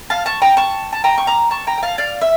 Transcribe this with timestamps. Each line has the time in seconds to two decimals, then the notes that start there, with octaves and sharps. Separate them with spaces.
0.10 F5 A5
0.26 A5 C#6
0.42 G5 A#5
0.57 A5 C#6
0.93 A5
1.04 G5 A#5
1.18 C#6
1.27 A#5 D6
1.51 A5 C#6
1.67 G5 A#5
1.78 G5
1.83 F5 A5
1.98 D5 F5
2.21 E5